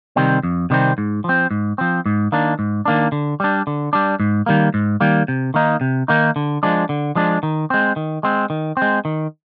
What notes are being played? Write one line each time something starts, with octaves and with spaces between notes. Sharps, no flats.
C3 D#3 G3 C4
F2
C3 D#3 G3 C4
G#2
F3 C4
G#2
F3 C4
G#2
D#3 A#3 D4
G#2
D#3 A#3 D4
D3
G3 D4
D3
G3 D4
G#2
D#3 G3 A#3
G#2
D#3 G3 A#3
C3
D#3 A#3 D#4
C3
D#3 A#3 D#4
D3
F3 G#3 D4
D3
F3 G#3 D4
D#3
G#3 C4
D#3
G#3 C4
D#3
C4
G#3
D#3